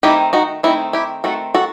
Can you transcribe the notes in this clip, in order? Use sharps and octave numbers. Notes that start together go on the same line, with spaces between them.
D#3 A3 C4 D#4 E4 G4
D#4 F#4
D#3 A3 C4 D#4 E4
E4 G4
D#3 A3 C4 F#4 A4
F#4 A4